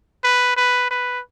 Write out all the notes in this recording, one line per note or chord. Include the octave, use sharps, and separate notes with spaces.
B4
B4
B4